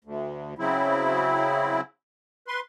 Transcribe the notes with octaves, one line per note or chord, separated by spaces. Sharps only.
D2
C#3 F#3 C4 E4
B4 C6